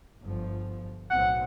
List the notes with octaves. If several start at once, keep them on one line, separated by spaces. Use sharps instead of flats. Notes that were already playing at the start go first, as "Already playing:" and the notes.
G1 F3
B1 A2 C4 F#5